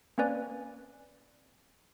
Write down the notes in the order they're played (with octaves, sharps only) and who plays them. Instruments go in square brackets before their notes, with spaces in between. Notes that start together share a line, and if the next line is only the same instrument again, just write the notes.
[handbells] A#3 C4 C#4 B4 D5 G#5